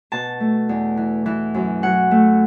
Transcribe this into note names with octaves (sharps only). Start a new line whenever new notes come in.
B2 A5
A3
E2
E3
E3
F#2
F#3 F#5
A3